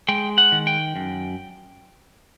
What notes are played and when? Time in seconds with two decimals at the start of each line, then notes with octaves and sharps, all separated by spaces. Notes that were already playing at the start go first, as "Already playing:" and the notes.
0.08 G#3 G5
0.38 F#5
0.52 D#3
0.67 G5
0.96 F#2